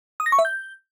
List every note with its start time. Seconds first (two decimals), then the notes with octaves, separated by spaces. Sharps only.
0.20 D#6
0.26 A#6
0.32 C#6
0.39 E5
0.45 G6